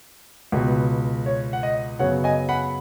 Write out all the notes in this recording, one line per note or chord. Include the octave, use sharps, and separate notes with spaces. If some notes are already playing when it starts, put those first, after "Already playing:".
C#2 B2 B3
C#5
F#5
D#5
F#2 C#3 F#3 B3 C#5 F#5
D#5 G#5
F#5 B5